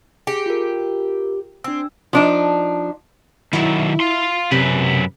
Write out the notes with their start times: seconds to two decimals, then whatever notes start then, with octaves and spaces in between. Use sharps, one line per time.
0.27 G4 G#4
0.46 F4 A#4
1.64 C4 D4 E6
2.13 F3 D4 D#4
3.53 D#3 F#3 E4
4.00 F5 C6
4.51 F#2 C3 B4